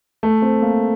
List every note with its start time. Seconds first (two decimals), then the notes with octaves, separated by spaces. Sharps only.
0.23 A3
0.42 C4
0.62 A#3